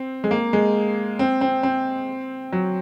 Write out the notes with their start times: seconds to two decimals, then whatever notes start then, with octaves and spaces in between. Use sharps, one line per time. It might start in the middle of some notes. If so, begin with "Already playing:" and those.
Already playing: C4
0.24 G#3
0.31 A#3
0.53 G#3
1.19 C4
1.41 C4
1.63 C4
2.53 F#3